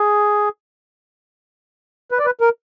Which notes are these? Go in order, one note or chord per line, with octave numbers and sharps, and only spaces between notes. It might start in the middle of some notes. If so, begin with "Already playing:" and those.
Already playing: G#4
B4
D5
B4
A#4